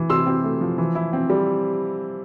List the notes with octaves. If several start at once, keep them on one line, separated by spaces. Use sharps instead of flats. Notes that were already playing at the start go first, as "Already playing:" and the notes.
Already playing: E3
C3 C6 E6
C4
A3
F3
E3
E4
C4
G3